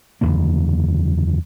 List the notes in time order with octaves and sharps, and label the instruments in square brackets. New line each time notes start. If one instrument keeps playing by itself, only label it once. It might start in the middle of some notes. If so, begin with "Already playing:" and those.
[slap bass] F#1 E2 D3 A#3